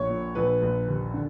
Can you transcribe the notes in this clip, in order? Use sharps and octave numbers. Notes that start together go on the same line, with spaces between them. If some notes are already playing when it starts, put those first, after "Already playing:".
Already playing: A#1 C#5
A#2
A#1 B4
A#1
D#2
D3